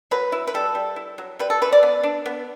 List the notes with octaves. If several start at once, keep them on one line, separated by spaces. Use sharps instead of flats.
F#3 B4
E4
B4
G3 A4
G3
E4
F#3
G3 B4
A4
E3 B4
D5
B3
D4
B3